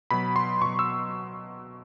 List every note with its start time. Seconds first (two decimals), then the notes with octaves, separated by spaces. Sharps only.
0.11 B2 F#3 B5
0.36 C6
0.62 B2 F#3 C#6
0.79 E6